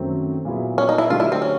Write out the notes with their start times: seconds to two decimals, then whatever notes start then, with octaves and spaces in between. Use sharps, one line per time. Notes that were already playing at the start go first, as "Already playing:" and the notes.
Already playing: F#2 D#3 F#3 A3 C4
0.45 A#2 F#3 B3 E4 G#4
0.78 C#4
0.89 D#4
0.98 E4
1.10 D3 F#3 A3 D4 F4 G4
1.20 E4
1.32 C4
1.42 C#4